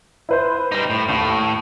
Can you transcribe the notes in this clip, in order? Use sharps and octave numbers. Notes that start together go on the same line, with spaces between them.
E4 B4 C5
G3 D#4
A2
D#2 A2